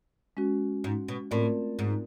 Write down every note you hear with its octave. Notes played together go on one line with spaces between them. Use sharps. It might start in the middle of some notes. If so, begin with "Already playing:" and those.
G#3 C#4 F#4
G#2
B2
A2 A3 C4 F4 A#4 D5
G#2